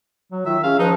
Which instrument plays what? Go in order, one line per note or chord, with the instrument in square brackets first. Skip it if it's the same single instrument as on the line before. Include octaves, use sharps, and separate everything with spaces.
[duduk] F#3
[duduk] D#3 [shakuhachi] F4 [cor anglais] E5
[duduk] C#4 [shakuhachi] G#4 [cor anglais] F5
[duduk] F3 [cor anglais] D#4 [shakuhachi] B4